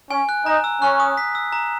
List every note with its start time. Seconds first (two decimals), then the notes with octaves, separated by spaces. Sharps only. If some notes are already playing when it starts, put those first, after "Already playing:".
0.11 C#4 G#5
0.29 F#6
0.46 D#4 A#5
0.64 E6
0.81 C#4 F#6
1.00 D#6
1.17 B6
1.35 E6
1.53 A#5